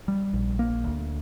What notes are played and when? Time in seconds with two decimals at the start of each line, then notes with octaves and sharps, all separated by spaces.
0.08 G3
0.33 A#1
0.59 A#3
0.84 D2